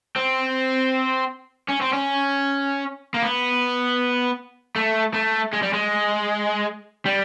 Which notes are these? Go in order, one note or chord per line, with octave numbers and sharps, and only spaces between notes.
C4
C#4
C4
C#4
A#3
B3
A3
A3
G#3
G3
G#3
G3